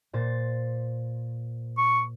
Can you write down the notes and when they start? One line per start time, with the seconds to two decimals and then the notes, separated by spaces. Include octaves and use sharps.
0.13 A#2 C5 A6
1.78 C#6